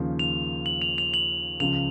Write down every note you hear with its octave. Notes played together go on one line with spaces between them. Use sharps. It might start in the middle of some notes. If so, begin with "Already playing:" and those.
Already playing: D#2 C#3 F3 A#3
F7
F#7
F7
F7
F#7
C#2 C#3 F3 F7